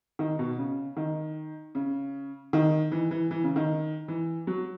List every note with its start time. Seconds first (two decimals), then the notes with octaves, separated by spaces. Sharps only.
0.19 D#3
0.39 B2
0.58 C#3
0.97 D#3
1.75 C#3
2.53 D#3
2.92 E3
3.11 E3
3.31 E3
3.44 C#3
3.56 D#3
4.08 E3
4.47 F#3